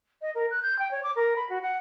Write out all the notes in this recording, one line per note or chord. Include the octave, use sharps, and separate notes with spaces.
D#5
A#4
F#6
G6
G5
C#5
D6
A#4
B5
F#4
F#5